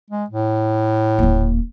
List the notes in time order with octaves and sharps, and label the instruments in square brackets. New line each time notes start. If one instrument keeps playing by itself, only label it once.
[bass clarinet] G#3
A2
[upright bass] D#1 A#3